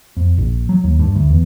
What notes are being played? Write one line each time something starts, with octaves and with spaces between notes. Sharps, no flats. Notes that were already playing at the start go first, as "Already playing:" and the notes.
F2
A#1
F#3
D#2
G2
D2
E2